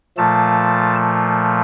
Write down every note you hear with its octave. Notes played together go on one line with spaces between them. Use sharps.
A#2 F3 A3 A5